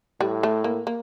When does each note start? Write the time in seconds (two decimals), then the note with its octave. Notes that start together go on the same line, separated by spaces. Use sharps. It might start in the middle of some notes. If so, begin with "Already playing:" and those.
0.21 A2 G3
0.43 A3
0.64 A#3
0.87 A#3